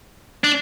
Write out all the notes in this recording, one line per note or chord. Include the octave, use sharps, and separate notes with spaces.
D4